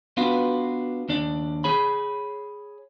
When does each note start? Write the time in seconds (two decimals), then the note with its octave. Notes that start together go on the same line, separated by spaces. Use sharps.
0.17 B3 D4 F4 F#4 B4
1.09 D#2 D4 D5
1.64 G#4 C#5 B5